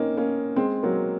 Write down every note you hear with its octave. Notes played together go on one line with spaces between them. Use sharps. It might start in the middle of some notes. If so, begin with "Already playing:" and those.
Already playing: A#3 C4 C#4 D#4
A#3 C#4
G#3 C4
F#3 A#3